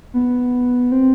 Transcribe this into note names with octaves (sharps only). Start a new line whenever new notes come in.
B3
C4